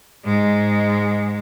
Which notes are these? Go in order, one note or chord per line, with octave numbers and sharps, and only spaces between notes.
G#2 G#3